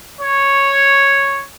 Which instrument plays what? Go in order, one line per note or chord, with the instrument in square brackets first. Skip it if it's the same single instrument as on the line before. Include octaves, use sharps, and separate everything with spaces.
[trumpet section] C#5